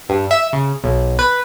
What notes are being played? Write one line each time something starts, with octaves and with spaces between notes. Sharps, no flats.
G2
E5
C#3
B1
B4